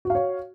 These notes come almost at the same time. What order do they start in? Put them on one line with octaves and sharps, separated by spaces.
F#4 F5 C#5